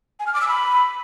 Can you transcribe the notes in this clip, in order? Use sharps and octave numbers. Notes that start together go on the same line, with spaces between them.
G#5
F6
D6
E6
B5